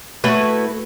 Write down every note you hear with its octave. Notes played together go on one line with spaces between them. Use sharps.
A3 E4 F#4 B4